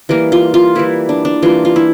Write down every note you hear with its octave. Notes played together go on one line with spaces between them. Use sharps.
E3 G3 A#3 A#4
F4
F4
E3 G3 A#3 E4
D4
D4
E3 G3 A#3 F4
F4
E4